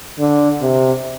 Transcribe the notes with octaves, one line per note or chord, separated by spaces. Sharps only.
D3
C3